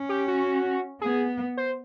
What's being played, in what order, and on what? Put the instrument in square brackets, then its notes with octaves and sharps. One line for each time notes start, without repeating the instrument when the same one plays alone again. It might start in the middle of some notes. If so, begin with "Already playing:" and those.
Already playing: [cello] C#4
[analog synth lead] G4
F#4
[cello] B3 [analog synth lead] G#4
[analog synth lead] C5